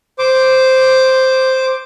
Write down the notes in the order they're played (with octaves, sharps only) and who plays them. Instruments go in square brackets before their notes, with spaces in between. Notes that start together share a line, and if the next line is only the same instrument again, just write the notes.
[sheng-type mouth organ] C5 D6